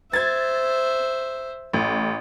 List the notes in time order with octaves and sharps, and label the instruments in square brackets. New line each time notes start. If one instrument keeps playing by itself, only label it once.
[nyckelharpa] C5 E5 [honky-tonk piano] G#6 A6
[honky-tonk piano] A1